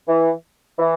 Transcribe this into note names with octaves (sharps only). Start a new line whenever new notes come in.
E3
E3